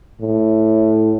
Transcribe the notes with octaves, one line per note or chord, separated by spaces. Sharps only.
A2